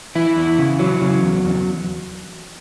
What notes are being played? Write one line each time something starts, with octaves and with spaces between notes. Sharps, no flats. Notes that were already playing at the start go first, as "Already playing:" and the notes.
E3 E4
E2
C#3
E3 F#3
C#3
E2
E2